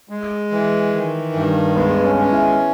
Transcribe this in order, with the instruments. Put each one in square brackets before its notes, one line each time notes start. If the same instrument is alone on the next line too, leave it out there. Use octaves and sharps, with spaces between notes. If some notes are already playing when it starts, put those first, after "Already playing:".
[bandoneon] G#3
E3
D#3
G2
[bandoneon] G#3 [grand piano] B3
[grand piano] C#4
[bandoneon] C#4
[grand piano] E4